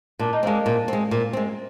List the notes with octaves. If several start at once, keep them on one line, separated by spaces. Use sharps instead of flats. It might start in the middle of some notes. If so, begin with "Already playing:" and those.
A#2 D4
D#4
G#3 A#3 C4 D4
A#2
G#3 C4
A#2
G#3 C4